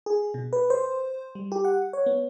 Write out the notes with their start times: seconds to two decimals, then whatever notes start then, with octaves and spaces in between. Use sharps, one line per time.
0.06 G#4
0.34 B2
0.53 B4
0.70 C5
1.35 G3
1.52 G4
1.65 F#5
1.93 C#5
2.06 B3